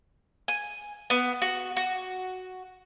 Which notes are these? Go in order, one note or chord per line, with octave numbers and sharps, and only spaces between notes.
G#5
B3
F#4
F#4